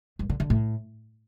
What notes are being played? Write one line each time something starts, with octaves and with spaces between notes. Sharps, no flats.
G2
D3
D3
A2